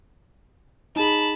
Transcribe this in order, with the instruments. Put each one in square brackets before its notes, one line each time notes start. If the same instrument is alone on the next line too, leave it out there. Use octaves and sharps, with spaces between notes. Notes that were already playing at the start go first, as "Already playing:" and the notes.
[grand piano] D#4 G#4 [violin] A5 B5